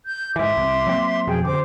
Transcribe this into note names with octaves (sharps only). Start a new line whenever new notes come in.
G6
G#2 E3 E5 C6 D6
C2
F#3 A#3 C4
F2 B2 F3 G#4 G5
F#2 D3 C5 D6